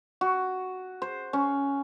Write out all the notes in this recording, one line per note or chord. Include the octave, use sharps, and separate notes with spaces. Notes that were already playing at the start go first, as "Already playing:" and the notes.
F#4
C5
C#4